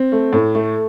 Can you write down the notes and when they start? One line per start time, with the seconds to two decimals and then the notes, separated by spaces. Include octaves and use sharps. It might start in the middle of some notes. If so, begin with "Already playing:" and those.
Already playing: C4
0.12 A3
0.33 A2
0.55 A3